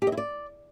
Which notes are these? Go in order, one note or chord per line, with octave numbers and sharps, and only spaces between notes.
G4
D#5
E4
D5